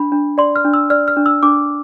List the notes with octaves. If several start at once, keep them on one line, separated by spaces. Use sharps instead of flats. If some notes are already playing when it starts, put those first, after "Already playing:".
Already playing: D4 B5
D4
D5 C6
F6
D4
E6
D5 F6
F6
D4
E6
D4 D6